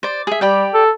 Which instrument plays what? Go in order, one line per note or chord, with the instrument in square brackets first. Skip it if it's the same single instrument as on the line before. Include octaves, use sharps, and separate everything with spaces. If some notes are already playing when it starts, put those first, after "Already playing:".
[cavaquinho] C5 D5
G#4 E5
[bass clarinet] G3 [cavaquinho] G4 D5 G5
[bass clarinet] A4